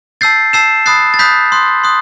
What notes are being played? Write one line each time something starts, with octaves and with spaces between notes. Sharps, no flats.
A5 E6 G6 A6 C7
A5 E6 G6 C7 E7
B5 D#6 F#6 A6 C7
A6
B5 D#6 F#6 G6 B6
C6 D#6 F#6
C6 D#6 F#6